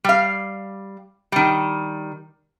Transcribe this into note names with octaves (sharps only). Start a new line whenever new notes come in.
G3 F5
D#3 G3